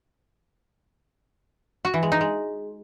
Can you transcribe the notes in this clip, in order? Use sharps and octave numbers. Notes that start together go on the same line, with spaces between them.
F#4
E3
G#3
D#4
G#3